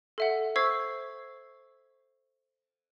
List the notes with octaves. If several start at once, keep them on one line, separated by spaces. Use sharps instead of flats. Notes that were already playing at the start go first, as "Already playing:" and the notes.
A4 E5 F#5
C5 C#6 E6 G#6 B6 C7